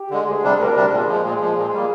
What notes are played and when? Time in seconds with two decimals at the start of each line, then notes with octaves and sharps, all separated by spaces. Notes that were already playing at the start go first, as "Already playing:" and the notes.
Already playing: G4
0.10 D3 G#3
0.26 D2 G#4
0.43 C3 G3 D4
0.59 D2 A#4
0.75 C3 G3 D4
0.91 A#2 G#4
1.07 F3 G#3
1.24 A#2 G#4
1.40 F3 G#3
1.56 A#2 G#4
1.73 G3 A#3